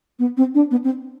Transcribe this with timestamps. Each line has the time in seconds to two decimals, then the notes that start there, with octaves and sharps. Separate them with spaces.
0.19 B3
0.37 C4
0.55 D4
0.71 B3
0.84 C4